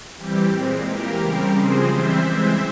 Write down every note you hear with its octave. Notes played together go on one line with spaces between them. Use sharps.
E3 G3 C4 G4
A#2 G#3 C4
E3 A#3 G4 A#4
C#3 G3 C4
C#3 F3 G#3 C4 G#4 C5
E3 G3 C4 C5 E5
E3 G#3 C4